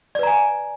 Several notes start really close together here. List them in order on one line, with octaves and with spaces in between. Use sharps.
D5 B4 A#5 G#5